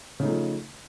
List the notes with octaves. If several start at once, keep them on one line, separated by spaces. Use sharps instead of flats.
C#3 F3 A3 D#4